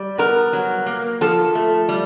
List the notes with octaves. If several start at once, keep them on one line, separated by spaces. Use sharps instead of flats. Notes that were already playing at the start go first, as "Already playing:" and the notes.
Already playing: G3
B3 A#4
F#3
A#3
F3 A4
A3
G3